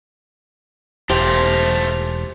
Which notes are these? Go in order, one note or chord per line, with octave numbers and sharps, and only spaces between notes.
E1 A3 F4 G4 C5